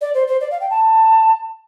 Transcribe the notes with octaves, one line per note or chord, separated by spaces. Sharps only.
D5
C5
C5
D5
F5
G5
A5